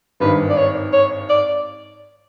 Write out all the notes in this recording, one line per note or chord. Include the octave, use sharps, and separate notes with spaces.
G#1 G2 D#3 B4
D5
C#5
C#5
D5